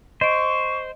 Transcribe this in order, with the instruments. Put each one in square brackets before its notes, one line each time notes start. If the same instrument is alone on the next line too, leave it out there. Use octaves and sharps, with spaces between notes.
[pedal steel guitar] C5 [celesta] D#5 D7 [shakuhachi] C#6